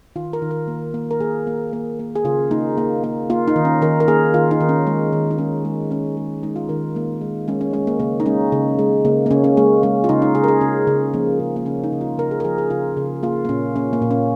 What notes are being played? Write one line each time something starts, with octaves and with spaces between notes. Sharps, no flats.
D#3 F4
A#4
D#3
A#4
A#3
A#3
A#4
A#3 G#4
A#3
A#3
A#3
G#4
C#3 F4
A#3 D#4
A#3
A#3
A#3 F4
D#4
D#3
C#4
D#3 A#4
A#4
A#3 G#4
D#3 F4
D#4
D#3
C#4
G#3
D#3
D#4
G#3 C#4
G#3
G#3 C#4
G#3
G#3 D#4
F4
D#3 A#4
G#3 A#3
G#3
G#3 C#4
C#4
G#3 C#4
A#3
C#3 A#3
D#4
G#3 C#4
C#3
G#3
C#3 A#3
A#3
C#3 C#4
C#4
G#3 A#3
G#3 C#4
F4
C#3 D#4
D#4
C#3 G#4
A#4
G#4
C#3 C#4
C#3
F3 A#3
C#3
A#3
C#3 C#4
D#4
C#3
F4
C#3 A#4
G#4
A#4
F3 G#4
G#4
C#3 F4
C#3
A#3 F4
A#3
A#2 C#4
A#3 C#4
A#3
A#2
C#4